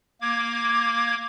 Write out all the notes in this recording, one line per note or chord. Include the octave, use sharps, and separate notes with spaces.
A#3 D6 G#6